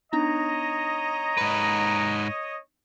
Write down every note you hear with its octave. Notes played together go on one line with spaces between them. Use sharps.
B3 D4 D#4 C#5 D#5 A#5
G#2 B4